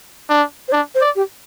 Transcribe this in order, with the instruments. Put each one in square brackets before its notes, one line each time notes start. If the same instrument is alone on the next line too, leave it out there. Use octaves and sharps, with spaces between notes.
[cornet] D4
[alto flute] C5
[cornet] D4 [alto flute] D5
[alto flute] C5
[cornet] D5
[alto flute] G4